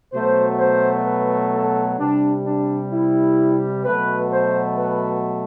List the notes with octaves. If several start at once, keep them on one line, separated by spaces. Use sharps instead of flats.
B2 F#3 A3 C5
C5
B4
A4
C3 G3 D4
D4
E4
B2 F#3 A3 B4
C5
B4